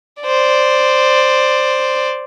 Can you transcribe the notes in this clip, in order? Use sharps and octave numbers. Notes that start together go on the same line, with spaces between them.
C5 D5